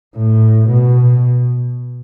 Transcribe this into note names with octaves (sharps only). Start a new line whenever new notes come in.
A2
B2